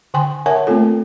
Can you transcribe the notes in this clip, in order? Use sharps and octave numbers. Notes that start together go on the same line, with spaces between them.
D3 G5 G#5 C6
A#4 C#5 E5 F#5 G#5 A5
A3 A#3 C4 F4 A4